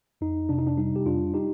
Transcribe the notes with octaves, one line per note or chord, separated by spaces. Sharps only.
F2 D#4
C3 D4
D#4
D4
G3 D#4
G4
F2 D4 F4
D#4 G4